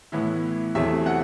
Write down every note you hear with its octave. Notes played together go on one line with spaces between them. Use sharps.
A2 E3 B3 E4
E2 C3 F#3 A3 E4 E5
F#5